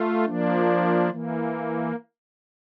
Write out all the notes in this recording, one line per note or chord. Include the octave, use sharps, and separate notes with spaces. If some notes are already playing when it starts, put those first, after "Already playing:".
Already playing: A3 F4
F3 A#3 D4
E3 A#3